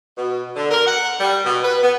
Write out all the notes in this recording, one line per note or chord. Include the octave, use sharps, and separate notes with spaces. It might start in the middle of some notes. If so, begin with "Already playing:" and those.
B2
D3
A#4
F#5
G3
B2
B4
B3